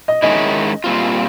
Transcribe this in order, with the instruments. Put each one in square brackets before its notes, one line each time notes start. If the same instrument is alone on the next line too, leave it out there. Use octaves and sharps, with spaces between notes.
[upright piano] D#5
[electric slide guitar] G#2 D#3 G#3 C#4 E4 [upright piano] D#5
[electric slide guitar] A#2 G3 C4 F4